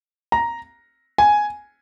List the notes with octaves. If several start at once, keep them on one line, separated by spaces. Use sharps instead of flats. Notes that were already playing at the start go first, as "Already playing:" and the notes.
A#5
G#5